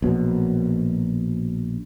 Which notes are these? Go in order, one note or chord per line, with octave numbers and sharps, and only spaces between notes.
A#1 B2 F#3